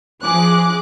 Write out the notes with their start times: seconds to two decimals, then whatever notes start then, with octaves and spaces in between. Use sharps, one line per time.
0.23 F3 G#4 D6 F#6